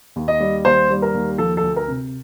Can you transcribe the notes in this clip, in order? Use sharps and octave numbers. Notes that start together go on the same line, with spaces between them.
D#2
D#5
G3
D#2 C5
G3
A#4
D#2
F3 A4
A4
D2
A#4
C3